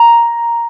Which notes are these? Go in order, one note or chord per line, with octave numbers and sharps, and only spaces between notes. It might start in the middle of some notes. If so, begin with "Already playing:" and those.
Already playing: A#5